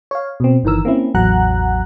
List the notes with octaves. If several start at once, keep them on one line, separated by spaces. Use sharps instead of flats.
C#5 F5
B2 C4
G1 D#3 E3 A#4 E6
A#3 C4 C#4 E4
A1 E2 F#3 F#5 A#5 F#6